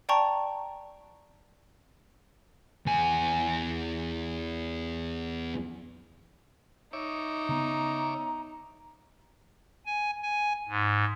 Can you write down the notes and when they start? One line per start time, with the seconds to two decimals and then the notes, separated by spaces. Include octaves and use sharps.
0.09 D5 G5 A5 A#5 C#6
2.86 E2 G#5
6.93 D#4 C#5 E5 D6
7.49 C#3 B3 A#5
9.86 G#5
10.22 G#5
10.69 G#2